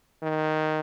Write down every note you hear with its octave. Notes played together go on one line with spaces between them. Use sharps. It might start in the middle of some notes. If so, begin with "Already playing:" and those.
D#3